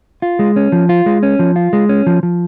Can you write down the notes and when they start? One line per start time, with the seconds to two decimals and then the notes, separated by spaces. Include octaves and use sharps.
0.22 F4
0.39 G#3
0.56 C#4
0.72 F3
0.89 F4
1.06 G#3
1.23 C#4
1.39 F3
1.56 F4
1.73 G#3
1.89 C#4
2.07 F3
2.23 F3